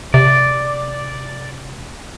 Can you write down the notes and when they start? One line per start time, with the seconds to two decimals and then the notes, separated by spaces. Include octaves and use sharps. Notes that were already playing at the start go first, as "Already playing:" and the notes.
0.14 C3 D5